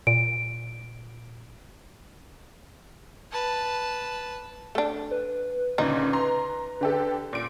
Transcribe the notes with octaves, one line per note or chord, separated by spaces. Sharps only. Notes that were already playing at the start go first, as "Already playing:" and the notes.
A#2 D7
B4 A5
A3 D4
B4
D2 A#2 C#3 D#4
A#5 C6
D3 G4 A4
A#2 D7